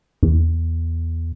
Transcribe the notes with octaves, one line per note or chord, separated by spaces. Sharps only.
E2